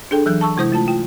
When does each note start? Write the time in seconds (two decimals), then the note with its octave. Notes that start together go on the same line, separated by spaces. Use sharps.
0.11 D4 G#4 A4 G5
0.26 E3 F#3 G6
0.41 A5 C#6 E6
0.57 C3 G#3 E4 C5 D#6 G6
0.72 A3 F4 A5
0.88 F4 G5